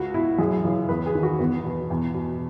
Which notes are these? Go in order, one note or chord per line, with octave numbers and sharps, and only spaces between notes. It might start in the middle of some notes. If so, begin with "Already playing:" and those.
Already playing: C#2 F#4
B2 E4
F#2 G#4
C#3 E3
E2 B4
G#4
D#3
F#4
E2 B3
B2
E2
B2